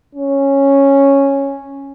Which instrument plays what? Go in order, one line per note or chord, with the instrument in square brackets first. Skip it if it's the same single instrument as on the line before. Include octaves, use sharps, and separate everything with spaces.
[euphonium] C#4